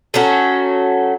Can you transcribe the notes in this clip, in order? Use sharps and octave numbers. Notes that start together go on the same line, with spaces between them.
F#3 A3 C#4 F#4